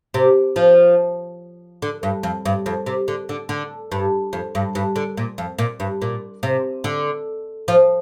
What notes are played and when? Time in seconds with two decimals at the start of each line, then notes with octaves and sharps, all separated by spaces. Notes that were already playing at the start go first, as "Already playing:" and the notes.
0.14 C3
0.56 F3
1.82 D3
2.03 G2
2.23 F2
2.45 G2
2.66 F2
2.86 C3
3.08 D3
3.29 D3
3.49 D3
3.92 G2
4.33 F2
4.55 G2
4.75 G2
4.96 D3
5.17 A#2
5.38 F2
5.58 A#2
5.80 G2
6.02 A#2
6.43 C3
6.84 D3
7.68 F3